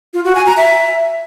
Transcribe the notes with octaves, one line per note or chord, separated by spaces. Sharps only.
F4
F#4
G#5
A#5
E5